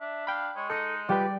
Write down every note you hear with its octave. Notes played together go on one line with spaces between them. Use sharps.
D4 E5
F5 G5 B5
G#3 C#5
D#4 A4 D#6 A#6 C#7
G3 F4 G4 B4 D5 G5